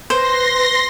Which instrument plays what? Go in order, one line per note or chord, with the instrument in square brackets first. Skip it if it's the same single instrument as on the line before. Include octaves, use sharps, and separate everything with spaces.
[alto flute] B4 [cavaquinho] C5 [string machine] C6 A#6